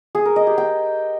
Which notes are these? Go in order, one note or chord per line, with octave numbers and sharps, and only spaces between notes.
G#4
A#4
D#5
G4
G5